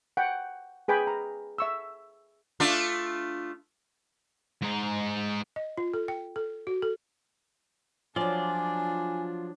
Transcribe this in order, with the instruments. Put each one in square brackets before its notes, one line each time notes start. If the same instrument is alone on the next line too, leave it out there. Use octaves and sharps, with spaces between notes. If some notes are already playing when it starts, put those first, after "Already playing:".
[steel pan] F#5 G5
G#4 B4 G5 G#5 B5
A#5
E5 C#6 E6
[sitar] A3 D4 F4
[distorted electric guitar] G#2 D#4
[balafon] D#5
F4
A4
G5
A4
F#4
A4
[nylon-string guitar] F3 F#3 [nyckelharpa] D4 [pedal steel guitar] F4 D5 [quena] G#5